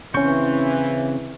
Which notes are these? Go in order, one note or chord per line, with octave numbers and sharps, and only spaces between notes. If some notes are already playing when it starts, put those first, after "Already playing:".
C#3 E3 C4 C#4 C#6 G6